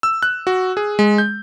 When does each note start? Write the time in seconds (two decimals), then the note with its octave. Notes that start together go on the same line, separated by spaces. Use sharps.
0.03 E6
0.23 F#6
0.47 F#4
0.77 G#4
0.99 G#3
1.18 G6